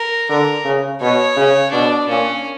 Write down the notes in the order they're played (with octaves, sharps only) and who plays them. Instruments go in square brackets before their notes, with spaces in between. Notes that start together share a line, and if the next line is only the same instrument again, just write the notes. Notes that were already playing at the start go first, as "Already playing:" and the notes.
Already playing: [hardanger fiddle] A#4
[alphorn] D3 [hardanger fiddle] A#4
[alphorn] C#3
[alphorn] B2 [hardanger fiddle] C#5
[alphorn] C#3
[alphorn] B2 [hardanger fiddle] D4
[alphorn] A#2 [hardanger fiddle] C#4